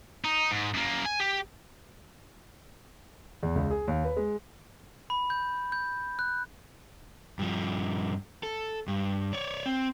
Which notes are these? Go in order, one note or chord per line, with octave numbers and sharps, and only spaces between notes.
D#4
G#2
F#2 A#3
G#5
G4
E2
C#2
G#4
D#2
B4
G#3
B5
G6
G6
F#6
G2 F3
A4
G2
C#5 D5
C4